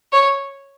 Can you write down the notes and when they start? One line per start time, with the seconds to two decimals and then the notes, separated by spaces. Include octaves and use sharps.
0.12 C#5